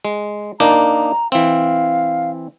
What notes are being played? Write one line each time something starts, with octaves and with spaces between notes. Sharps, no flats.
G#3
A#3 D4 D#4 A#5
E3 C4 F5